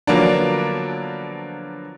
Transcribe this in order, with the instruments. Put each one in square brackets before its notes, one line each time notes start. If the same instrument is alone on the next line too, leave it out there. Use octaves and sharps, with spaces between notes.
[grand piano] D3 F3 F#3 A#3 B3 D4